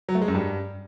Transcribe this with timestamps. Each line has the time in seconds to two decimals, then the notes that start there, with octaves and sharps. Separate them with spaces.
0.09 F#3
0.15 A3
0.22 G#3
0.28 F#2
0.34 G2